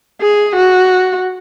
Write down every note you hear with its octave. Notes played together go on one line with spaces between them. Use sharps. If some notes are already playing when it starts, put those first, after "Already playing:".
G#4
F#4